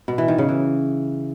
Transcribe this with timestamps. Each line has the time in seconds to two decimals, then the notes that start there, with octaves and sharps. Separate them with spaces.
0.08 B2
0.18 E3
0.28 D#3
0.38 C#3
0.49 E3